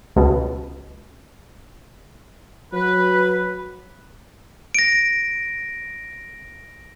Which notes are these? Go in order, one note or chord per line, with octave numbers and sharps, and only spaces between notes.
C#2 B2
F#3 B4
A#6 D7